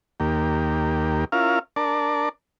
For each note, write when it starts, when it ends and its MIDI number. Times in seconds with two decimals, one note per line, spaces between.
0.20 1.25 39
0.20 1.25 58
0.20 1.25 67
1.32 1.59 61
1.32 1.59 64
1.32 1.59 65
1.32 1.59 70
1.32 1.59 77
1.76 2.29 62
1.76 2.29 70
1.76 2.29 74
1.76 2.29 81